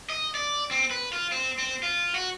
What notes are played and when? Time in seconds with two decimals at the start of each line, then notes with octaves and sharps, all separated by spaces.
0.10 D#5
0.35 D5
0.71 C4
0.91 B4
1.13 F4
1.32 C4
1.59 C4
1.83 F4
2.15 F#4